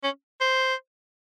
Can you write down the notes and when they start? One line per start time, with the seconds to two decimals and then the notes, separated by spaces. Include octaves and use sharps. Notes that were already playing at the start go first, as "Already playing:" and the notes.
0.04 C#4
0.41 C5